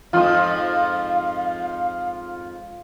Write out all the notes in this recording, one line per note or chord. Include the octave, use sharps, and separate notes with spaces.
F2 G#2 F3 F4 F5 D#6